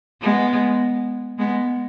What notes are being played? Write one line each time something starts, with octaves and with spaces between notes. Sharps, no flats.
G#3 B3
G#3 B3